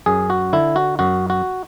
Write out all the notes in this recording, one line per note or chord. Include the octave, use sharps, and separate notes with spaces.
F#2 G#4
F#4
D3 E4
F#4
F#2 F#4
F#4